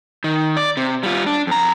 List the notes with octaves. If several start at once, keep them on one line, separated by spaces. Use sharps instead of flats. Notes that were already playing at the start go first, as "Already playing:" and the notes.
D#3
D5
C3
G3 F4
D4
F2 A#5